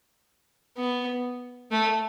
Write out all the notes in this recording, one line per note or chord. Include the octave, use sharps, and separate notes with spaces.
B3
A3